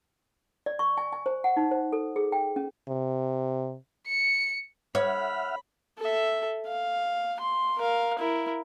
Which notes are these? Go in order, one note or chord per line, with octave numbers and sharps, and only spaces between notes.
D5
C#6
G#5
G#5
C5
F#5
D#4
C5
A4
G#4
G5
C#4
C3
C#7
C#5 E5 F#5 B5 F6
A4 E5
F5
C6
A#4 F5
E4 A#4